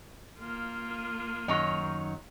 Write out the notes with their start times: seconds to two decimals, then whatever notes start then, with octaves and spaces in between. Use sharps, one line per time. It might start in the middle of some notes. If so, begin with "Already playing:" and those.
0.39 A#3 F4
1.48 F#2 D#3 F#3 D#4 C#5